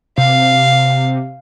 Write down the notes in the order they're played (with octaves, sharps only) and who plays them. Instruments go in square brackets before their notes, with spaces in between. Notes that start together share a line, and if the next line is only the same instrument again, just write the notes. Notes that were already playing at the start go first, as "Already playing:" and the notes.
[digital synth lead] C3 [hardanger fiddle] F5